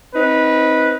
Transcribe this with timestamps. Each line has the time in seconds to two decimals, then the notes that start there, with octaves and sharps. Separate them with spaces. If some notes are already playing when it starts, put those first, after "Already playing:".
0.15 C4 D#4 B4